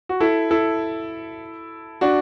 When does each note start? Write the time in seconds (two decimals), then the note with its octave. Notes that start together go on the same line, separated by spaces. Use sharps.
0.09 F#4
0.20 E4 A4
0.51 E4 A4
2.01 D4 F#4